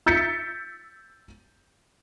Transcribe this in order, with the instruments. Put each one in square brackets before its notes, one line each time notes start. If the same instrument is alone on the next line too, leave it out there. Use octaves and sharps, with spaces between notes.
[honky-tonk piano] E6 G6 A6 B6 C#7